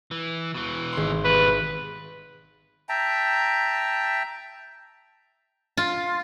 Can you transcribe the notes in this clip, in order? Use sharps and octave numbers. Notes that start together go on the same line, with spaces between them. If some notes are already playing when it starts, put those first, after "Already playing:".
E3
B2 E3
G#1 C6
B2 G3 B4
E5 G5 A5 A#5
F4